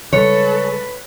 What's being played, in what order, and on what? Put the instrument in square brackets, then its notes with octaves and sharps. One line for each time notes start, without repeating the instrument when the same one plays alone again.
[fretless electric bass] C#3 G3 G#3 [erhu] A4 [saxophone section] B4 [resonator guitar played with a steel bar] C#5